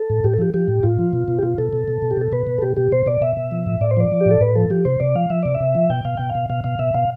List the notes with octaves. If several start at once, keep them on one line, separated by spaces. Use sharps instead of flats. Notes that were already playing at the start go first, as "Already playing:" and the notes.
Already playing: A4
A2
A2 G4
A4
F3 G4
F3 G4
A2
A2 F4
F3
B2
B2
G4
B2 F4
B2 A4
B2
B2
B2
G4
B2 A4
B2 B4
B2
A4
B2 G4
B2 G4
B2 C5
B2 D5
B2 E5
B2
F3
A2
A2 D5
C5
F3 D5
F3
G4
A2 A4
A2 B4
F3 A4
F3 G4
C3 C5
C3 D5
F3 F5
F3 E5
C3 D5
E5
C3
F3
B2 G5
B2 F5
B2 G5
F5
B2
B2 F5
B2 F5
B2 E5
B2 F5